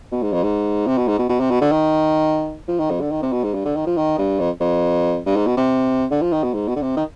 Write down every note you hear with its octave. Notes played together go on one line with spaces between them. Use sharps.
B2
G#2
F2
G#2
C3
B2
G#2
B2
B2
C3
B2
D3
D#3
F3
D#3
F2
D3
D#3
C3
B2
G#2
G2
D3
D#3
F3
D#3
G2
F2
F2
G2
G#2
B2
C3
D3
F3
D#3
B2
G#2
B2
D3
C3
D#3